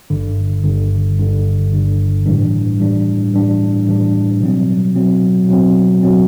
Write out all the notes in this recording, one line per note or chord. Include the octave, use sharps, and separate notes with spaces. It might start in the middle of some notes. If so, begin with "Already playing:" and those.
G1 G2 D3
G1 G2 D3
G1 G2 D3
G1 G2 D3
A2 E3 G3 D4
A2 E3 G3 D4
A2 E3 G3 D4
A2 E3 G3 D4
B2 F#3 C4
B2 F#3 C4
B2 F#3 C4
B2 F#3 C4